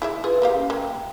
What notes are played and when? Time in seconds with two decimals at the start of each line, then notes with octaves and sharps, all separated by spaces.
0.02 E4 G#4 E5
0.24 F4 G#4 B4
0.42 A#3 G4 F5
0.54 C#4
0.70 A#3 G5